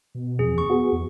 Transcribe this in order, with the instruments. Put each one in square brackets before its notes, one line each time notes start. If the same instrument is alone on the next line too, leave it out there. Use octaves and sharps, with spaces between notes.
[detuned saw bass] B2
[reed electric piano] E2 F3 C4 [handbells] G#4
[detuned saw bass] D#2 [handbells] C#6
[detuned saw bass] B3 [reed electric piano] F#4 G#4
[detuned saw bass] E2